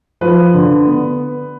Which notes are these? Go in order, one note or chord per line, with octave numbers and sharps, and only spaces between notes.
F3 B4
D3
B3